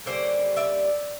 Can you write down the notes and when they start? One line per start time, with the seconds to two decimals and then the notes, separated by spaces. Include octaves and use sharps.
0.06 D3 G3 A#3 C#4 C5 D5
0.57 D5 E5